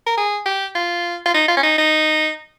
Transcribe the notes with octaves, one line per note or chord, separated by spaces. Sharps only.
A#4
G#4
G4
F4
F4
D#4
F4
C#4
D#4
D#4